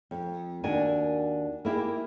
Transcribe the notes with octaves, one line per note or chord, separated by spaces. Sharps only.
F2
D#2 D4 F#4 A#4 G#5
A#3 E4 G4 G#4